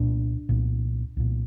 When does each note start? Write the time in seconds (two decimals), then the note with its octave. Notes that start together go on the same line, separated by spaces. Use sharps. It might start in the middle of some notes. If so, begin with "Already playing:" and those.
Already playing: C2 A#2 D4
0.49 C2 A#2
1.17 C2 A#2